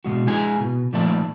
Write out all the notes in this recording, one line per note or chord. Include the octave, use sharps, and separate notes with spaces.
B2 G#3 F#4
G#3 E4 G#4 G#5
B2
A#2 D#3 F3 A3 D5 A5